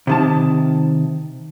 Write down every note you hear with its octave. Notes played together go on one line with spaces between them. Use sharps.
C3 D#3 A5